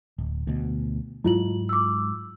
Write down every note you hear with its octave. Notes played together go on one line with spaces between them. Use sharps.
D1
D2 B2
G#2 F#3 G#3 E4 F4 F#7
D6 E6